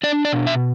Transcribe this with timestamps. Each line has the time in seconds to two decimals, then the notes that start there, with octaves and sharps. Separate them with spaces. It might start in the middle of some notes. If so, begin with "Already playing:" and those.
0.03 D4 D5
0.25 D5
0.32 B2
0.47 E5